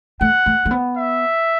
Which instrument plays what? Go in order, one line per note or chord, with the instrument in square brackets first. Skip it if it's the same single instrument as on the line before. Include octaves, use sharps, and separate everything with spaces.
[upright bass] A3 [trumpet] F#5
[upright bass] A3
A3
B3
[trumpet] E5